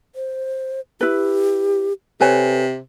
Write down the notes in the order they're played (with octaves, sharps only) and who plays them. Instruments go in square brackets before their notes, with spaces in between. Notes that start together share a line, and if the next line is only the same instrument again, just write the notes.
[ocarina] C5
[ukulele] E4 B4 [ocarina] G4
[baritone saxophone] C3 [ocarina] A4 [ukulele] B4 C#5 G#5